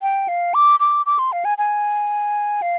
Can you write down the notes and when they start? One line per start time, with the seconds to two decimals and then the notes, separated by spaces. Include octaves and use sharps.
0.02 G5
0.28 F5
0.54 D6
0.80 D6
1.06 D6
1.19 C6
1.32 F5
1.45 G#5
1.58 G#5
2.62 F5